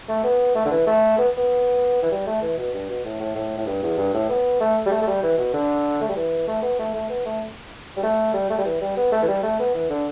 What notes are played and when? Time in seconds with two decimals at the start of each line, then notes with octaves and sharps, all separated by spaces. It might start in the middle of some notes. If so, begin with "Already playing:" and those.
0.09 A3
0.24 B3
0.55 A3
0.65 D3
0.71 E3
0.87 A3
1.18 B3
1.37 B3
2.02 E3
2.11 G3
2.27 A3
2.42 E3
2.58 B2
2.74 G2
2.89 B2
3.05 A2
3.20 A2
3.35 A2
3.58 A2
3.66 G2
3.83 E2
3.98 G2
4.14 A2
4.29 B3
4.60 A3
4.86 G3
4.91 A3
5.02 A3
5.07 G3
5.23 E3
5.38 B2
5.53 D3
6.01 A3
6.09 G3
6.16 E3
6.47 A3
6.62 B3
6.79 A3
6.94 A3
7.10 B3
7.26 A3
7.97 G3
8.03 A3
8.34 G3
8.50 A3
8.58 G3
8.65 E3
8.81 G3
8.97 B3
9.12 A3
9.23 E3
9.28 G3
9.43 A3
9.59 B3
9.74 E3
9.90 D3